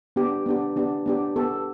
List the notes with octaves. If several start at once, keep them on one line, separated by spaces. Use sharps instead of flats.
B3 D4 G4
B3 D4 G4
B3 D4 G4
B3 D4 G4
B3 G4 A4